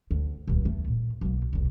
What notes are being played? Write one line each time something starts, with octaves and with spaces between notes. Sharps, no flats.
D2
D#1 C#2
E2 A3
A#2
B1 A#3
E1 C2